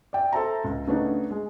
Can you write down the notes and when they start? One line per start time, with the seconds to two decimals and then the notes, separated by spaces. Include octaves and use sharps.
0.13 D5 E5 G5
0.33 A4 C5 E5 A5 A#5
0.64 C#2
0.87 C#3 A3 B3 D4 D#4
1.31 G#3